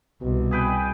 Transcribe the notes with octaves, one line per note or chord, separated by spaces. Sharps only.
C2 B2
G#4 B4 G5